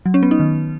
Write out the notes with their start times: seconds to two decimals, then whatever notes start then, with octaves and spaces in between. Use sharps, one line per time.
0.06 F#3
0.14 C#4
0.23 B3
0.31 D#4
0.40 D#3